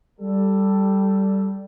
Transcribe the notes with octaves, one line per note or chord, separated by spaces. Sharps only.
G3 A4